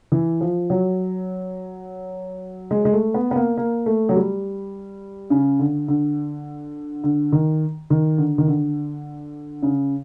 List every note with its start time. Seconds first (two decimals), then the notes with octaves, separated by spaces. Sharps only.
0.12 E3
0.41 F3
0.70 F#3
2.71 G#3
2.85 G#3
2.93 A3
3.14 B3
3.31 B3
3.36 A#3
3.57 A#3
3.86 A3
4.09 F#3
4.16 G3
5.30 C#3
5.59 D3
5.88 D3
7.04 D3
7.32 D#3
7.90 D#3
8.18 D3
8.38 D#3
8.48 D3
9.63 C#3